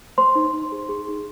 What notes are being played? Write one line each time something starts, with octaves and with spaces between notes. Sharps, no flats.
C5 C6
D#4
D#4
G#4
G#4
D#4